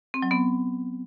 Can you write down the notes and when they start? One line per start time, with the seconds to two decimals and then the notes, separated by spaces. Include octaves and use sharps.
0.14 C4
0.22 F#3
0.31 B3